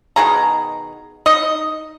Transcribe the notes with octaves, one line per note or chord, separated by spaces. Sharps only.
B2 D#3 G#4 A#5
D#4 D#5